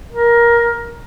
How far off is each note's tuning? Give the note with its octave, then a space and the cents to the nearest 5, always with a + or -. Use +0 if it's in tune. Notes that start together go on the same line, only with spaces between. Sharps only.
A#4 +15